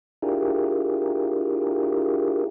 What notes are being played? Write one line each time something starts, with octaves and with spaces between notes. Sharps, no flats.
D4 E4 F4 G4 G#4 A#4